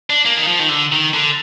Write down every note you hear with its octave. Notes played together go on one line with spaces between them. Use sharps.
D4
A#3
D#3
F3
D#3
D3
D#3
D3